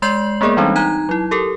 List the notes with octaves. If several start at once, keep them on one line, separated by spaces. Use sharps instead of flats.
G#3 D5 C6 G6 C7 F#7
G#3 A#3 B3 G#4 A#4 D5
E3 G3 G#3 C4 D4 D#4
D#4 A#5 F#6 G#6
F#3 E4
G4 A4 A#4